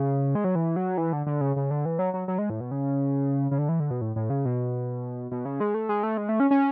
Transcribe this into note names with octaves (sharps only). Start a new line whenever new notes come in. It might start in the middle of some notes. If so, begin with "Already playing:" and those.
Already playing: C#3
G#3
F#3
E3
F#3
E3
D3
D3
C#3
C#3
D3
E3
F#3
F#3
F#3
G#3
A2
B2
C#3
C#3
D3
E3
D3
B2
A2
A2
C#3
B2
B2
C#3
G#3
A3
G#3
A3
G#3
A3
C#4
C#4